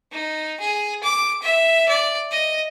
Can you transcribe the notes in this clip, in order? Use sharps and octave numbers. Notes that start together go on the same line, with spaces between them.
D#4
G#4
D6
E5
D5
D#5